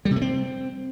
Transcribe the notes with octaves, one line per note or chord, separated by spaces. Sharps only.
G3
C3
A3
C4